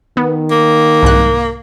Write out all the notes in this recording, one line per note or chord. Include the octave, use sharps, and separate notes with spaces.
D#3 B3
A#3
C2 G#2 F#6